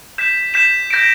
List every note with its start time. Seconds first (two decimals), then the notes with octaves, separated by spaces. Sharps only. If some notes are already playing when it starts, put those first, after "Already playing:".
0.18 G6 B6 E7
0.54 G6 B6 E7
0.90 G6 A#6 D7